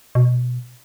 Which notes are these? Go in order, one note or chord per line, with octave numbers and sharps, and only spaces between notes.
B2